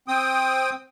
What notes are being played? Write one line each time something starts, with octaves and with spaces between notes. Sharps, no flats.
C4 G5 D#6